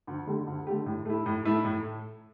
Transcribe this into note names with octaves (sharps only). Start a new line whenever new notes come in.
D2
D3 A3 G4
D2
D3 A3 G4
A2
A3 E4
A2
A3 E4
A2